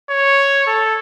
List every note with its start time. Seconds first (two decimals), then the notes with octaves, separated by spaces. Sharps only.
0.10 C#5
0.67 A4